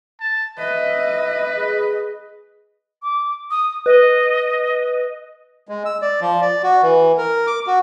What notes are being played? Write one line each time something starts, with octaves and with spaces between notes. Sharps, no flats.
A5
B4 D#5 E5
G#4
D6
D#6
B4 D#5
G#3
E6
D5
F3
D5
F#4
E3
A#4
D6
F#4